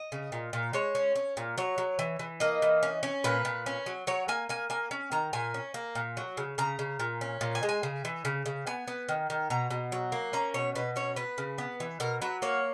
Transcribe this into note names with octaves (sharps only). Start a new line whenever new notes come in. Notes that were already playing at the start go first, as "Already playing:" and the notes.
Already playing: D#5
C#3
A#2
A#2
G#3 C#5
C#4
C#4
A#2
F#3 C#5
F#3
E3
E3
A#3 D#5
E3
C#4
C#4
A#2 B4
A#2
C#4
F#3
F#3 C#5
A#3 G#5
A#3 G#5
A#3 G#5
C#4
D#3 A#5
A#2 G#5
C#4
A#3
A#2
F#3
C#3
C#3 A#5
C#3
A#2
C#4
A#2
G#5
G#3
G#5
C#3
E3
C#3
C#3
B3 G#5
B3
D#3
D#3
B2 A#5
B2
F#3
A#3
C#4 A#5
B2 C#5
B2 B4
C#4 C#5
B3 B4
C#3
B3
E3
B2 A#4
F#3 B4
A#3 C#5